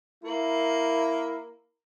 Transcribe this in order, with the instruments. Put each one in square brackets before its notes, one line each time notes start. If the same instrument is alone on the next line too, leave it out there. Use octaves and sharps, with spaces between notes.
[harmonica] A#3 [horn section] E4 A#4